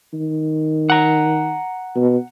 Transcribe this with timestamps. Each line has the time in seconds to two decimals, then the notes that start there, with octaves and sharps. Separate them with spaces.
0.13 D#3
0.90 F#5 A#5
1.95 B2